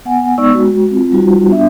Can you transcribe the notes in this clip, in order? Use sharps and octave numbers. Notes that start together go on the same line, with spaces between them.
B3 F#5 G#5
G#3 B3 D#4 D5 C#6 E6
G#3 F#4
C4 F4
G3 D#4 F4 F#4
B3 D4 E5